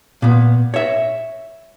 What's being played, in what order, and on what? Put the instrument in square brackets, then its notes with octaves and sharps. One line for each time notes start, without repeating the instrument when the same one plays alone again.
[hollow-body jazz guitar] A#2 B3
C#5 E5